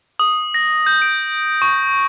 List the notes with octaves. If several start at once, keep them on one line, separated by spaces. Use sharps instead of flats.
D#6
A#6
G6
D7
C#6